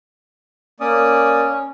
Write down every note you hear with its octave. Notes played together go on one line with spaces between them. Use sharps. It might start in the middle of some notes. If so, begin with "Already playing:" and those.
A#3 C#4 D5 D#6